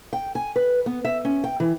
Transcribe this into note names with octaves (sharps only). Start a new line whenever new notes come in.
G5
G#5
B4
B3
E5
C#4
G5
E3